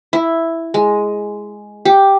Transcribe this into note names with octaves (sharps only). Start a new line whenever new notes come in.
E4
G#3
G4